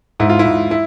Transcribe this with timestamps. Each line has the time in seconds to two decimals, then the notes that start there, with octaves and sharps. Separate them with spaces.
0.20 G#2 E4
0.29 F4
0.39 E4
0.45 G#2
0.71 E4